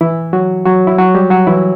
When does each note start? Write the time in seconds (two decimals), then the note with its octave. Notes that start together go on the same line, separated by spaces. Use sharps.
0.01 E3 E4
0.33 F#3 F#4
0.65 F#3 F#4
0.87 E4
0.98 F#3 F#4
1.15 G3 G4
1.30 F#3 F#4
1.47 E3 E4